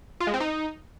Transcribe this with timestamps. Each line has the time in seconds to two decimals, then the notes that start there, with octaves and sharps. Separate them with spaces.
0.20 F4
0.27 G#3
0.34 C4
0.40 D#4